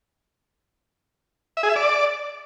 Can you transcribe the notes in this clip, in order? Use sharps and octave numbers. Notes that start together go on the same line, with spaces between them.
E5
G#4
E5
D5